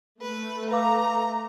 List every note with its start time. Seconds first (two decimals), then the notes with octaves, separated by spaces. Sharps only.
0.22 A3 B4
0.71 B4 F5 A#5 D6